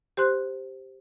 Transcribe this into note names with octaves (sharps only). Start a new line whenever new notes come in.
G4 C5 C6 F#6